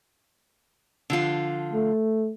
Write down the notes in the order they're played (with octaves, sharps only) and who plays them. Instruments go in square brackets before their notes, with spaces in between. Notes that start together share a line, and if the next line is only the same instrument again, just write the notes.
[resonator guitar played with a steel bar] D3 F3 F4
[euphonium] A3